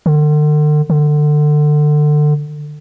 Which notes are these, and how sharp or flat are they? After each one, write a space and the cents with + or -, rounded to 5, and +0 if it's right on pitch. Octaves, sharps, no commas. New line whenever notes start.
D3 +40
D3 +25